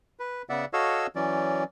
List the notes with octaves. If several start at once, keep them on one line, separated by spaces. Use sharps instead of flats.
B4
C#3 B3 D5 E5 F#5
F#4 A4 C#5 D#5 F5 E6
E3 F#3 C#4 D5